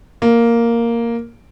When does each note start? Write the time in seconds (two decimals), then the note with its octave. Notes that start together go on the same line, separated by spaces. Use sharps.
0.22 A#3